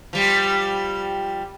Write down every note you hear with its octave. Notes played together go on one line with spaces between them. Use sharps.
F3 G3